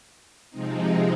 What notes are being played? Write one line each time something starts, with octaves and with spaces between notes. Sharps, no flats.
C3 F3 G#3 C4 D#4